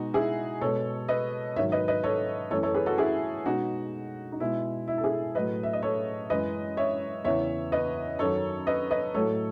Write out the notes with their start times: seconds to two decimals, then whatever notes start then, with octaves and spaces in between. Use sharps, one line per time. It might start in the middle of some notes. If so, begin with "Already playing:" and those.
Already playing: B2 G#3 D#4 F#4
0.14 E4 G#4
0.61 B2 G#3 A4 C#5
1.08 B4 D#5
1.56 G#2 D#3 F#3 C#5 E5
1.72 B4 D#5
1.88 B4 D#5
2.04 A4 C#5
2.51 F#2 E3 A3 A4 C#5
2.63 A4 C#5
2.74 G#4 B4
2.86 F#4 A4
2.98 E4 G#4
3.46 B2 G#3 D#4 F#4
4.32 D#4
4.40 B2 G#3 E4
4.88 E4
4.98 A4
5.04 E4 G#4
5.35 A2 F#3 A3 B4 D#5
5.63 E5
5.73 D#5
5.83 A4 C#5
6.30 F#2 E3 G#3 B4 D#5
6.77 C#5 E5
7.24 E2 C#3 E3 C#5 E5
7.72 B4 D#5
8.19 F#2 D#3 F#3 A4 C#5
8.67 B4 D#5
8.91 B4 D#5
9.14 A2 F#3 A3 A4 C#5